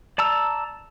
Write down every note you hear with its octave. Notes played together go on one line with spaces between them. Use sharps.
D5 A5 A#5 E6